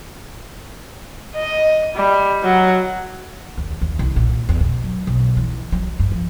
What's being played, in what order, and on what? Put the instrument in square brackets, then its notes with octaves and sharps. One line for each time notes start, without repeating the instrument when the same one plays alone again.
[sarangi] D#5
G3
F#3
[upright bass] D#2
D#2
C2
A#2
E2
B2
F#3
B1
E3
F#3
G2
F3